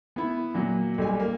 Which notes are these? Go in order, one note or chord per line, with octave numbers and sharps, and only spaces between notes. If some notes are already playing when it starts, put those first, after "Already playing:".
B3 E4
A#2 F#3
B1 G3 G#5
A#3